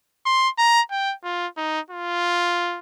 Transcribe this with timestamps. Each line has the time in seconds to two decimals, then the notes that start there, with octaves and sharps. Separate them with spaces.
0.26 C6
0.58 A#5
0.91 G5
1.24 F4
1.57 D#4
1.90 F4